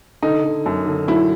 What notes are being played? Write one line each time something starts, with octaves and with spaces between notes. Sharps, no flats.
D3 D#4
D3
F#2
D3
F#3 E4